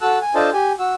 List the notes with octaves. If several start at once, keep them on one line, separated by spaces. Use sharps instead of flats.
F#4 A4 A5 E6 F#6
G#5
D4 F4 A4 C5 D#5 A5
G4 G#5
F#4 E6